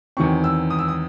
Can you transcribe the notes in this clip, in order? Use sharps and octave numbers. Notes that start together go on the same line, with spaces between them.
E2 D#3 F#3 C4 C#6
E6
D#6
E6
D#6